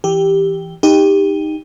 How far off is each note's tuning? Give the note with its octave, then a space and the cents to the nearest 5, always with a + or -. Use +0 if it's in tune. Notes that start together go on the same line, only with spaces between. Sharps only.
E3 +0 G4 +0
D#4 +0 G4 +15